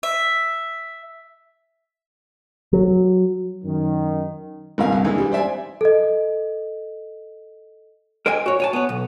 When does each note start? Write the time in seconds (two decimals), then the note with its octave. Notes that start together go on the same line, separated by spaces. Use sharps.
0.03 E5
2.73 F#3
3.65 F#2 D#3
4.78 G#1 G2 A#4 F5 G#5
4.92 C2
5.04 D#3 E3 G#3 A#3 D4
5.18 G3
5.32 C5 D5 E5 G#5
5.81 A4 D#5
8.26 A#4 C5 D#5 G5 G#5
8.46 F#4 C#5
8.60 C#5 G#5 A5
8.73 B3 C#5
8.89 B1